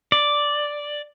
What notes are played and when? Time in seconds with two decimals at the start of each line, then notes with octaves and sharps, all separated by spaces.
0.12 D5